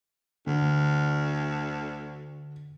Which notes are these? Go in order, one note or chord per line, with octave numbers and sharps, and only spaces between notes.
D2 D3